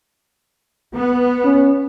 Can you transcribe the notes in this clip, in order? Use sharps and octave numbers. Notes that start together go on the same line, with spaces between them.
B3
C#4